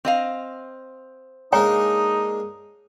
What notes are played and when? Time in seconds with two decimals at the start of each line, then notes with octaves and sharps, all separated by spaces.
0.05 C4 D#5 F5
1.53 G#3 A#3 D4 D#4 C#5 G#5 A#5